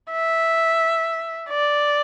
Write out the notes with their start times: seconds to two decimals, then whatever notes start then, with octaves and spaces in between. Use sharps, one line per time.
0.12 E5
1.49 D5